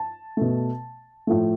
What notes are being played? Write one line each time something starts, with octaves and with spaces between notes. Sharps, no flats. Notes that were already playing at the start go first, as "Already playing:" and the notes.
Already playing: A5
B2 A3
A2 F3 A3